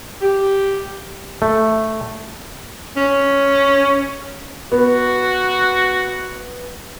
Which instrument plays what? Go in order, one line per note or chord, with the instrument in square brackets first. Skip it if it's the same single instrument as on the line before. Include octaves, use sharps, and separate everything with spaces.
[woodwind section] G4
[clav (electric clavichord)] A3
[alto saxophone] C#4
[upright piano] B3 [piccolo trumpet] F#4